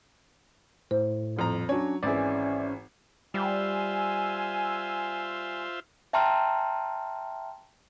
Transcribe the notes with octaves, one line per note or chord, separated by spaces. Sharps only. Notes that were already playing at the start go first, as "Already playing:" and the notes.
A2 C5
D#1 F2 A#5
F#3 C#4 D4 C#5
G#1 E3 C#4 G#4 D5 E5
G3 F4 C5 E5 G#5 E6
E5 G5 A5 A#5 C6 F6